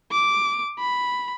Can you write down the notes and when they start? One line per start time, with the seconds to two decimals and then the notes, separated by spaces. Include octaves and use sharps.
0.11 D6
0.79 B5